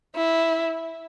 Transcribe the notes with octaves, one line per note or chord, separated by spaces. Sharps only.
E4